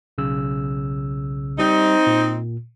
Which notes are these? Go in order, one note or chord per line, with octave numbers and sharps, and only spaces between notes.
B1 C#3 E6
G3 C4 D#4
A#2